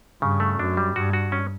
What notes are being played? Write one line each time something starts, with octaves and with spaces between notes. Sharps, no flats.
G2 C#3
A3
F#2 D4
G3
G2 F#4
F#4
C#4